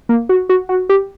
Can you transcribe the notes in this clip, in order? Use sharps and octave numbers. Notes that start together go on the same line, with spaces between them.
A#3
F#4
F#4
F#4
G4